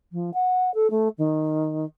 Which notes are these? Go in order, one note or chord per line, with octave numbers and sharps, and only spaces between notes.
F3
F#5
A4
A3
D#3